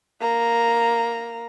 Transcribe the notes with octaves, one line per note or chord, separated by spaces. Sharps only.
A#3 A#5